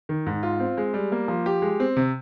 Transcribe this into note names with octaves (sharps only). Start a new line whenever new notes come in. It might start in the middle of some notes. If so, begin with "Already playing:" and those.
D#3
G#2
F4
C4
G#3
G3
A#3
F3
G4
G#3
C4
C3